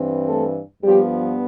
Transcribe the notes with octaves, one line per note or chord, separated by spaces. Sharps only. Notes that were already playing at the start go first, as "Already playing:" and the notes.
Already playing: G2 E3 C4
A3 A4
G2 F3 G3 B3 G4